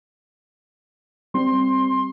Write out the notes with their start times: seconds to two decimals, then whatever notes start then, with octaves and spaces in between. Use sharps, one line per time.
1.34 G3 C4 C6